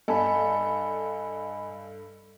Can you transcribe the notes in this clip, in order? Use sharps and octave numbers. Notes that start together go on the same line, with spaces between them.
G2 A4 D#5 G#5 B5